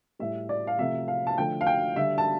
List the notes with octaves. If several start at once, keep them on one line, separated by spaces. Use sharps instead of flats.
A2 G3 E5
D5
F5
C3 F3 A3 E5
F5
A5
D3 F3 A3 G5
F5
G5
D3 G3 E5
A5